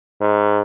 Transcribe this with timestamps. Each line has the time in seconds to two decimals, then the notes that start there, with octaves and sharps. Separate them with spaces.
0.21 G#2